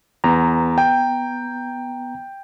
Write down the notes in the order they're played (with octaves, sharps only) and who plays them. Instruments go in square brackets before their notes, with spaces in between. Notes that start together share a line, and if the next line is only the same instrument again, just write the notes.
[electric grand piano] E2 [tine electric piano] B3 A#5
[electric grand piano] G5